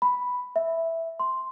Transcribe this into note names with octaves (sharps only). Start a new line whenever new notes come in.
B5
E5
C6